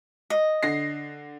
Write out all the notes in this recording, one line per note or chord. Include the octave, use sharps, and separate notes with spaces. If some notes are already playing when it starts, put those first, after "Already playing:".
D#5
D3 A#6 C7